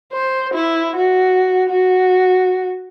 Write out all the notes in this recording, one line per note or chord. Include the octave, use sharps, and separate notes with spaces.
C5
E4
F#4
F#4